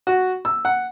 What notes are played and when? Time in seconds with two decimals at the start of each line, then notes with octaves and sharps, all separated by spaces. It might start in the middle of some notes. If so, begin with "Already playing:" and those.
0.07 F#4
0.45 E6
0.65 F#5